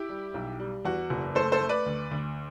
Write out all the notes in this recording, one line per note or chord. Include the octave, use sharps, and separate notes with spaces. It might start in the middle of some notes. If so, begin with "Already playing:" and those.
Already playing: E4 G4
G3
B1
G3
E2 F#4
F#1
A3 A4 C5
A4 C5
A3
B4 D5
D2
D2